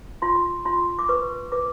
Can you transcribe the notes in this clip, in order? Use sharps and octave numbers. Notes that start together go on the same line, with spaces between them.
F4 C6
F4 C6
D6
B4 C#6
B4 D6